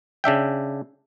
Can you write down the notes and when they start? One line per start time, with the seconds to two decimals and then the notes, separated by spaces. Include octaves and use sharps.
0.24 C#3 D4 E5 G5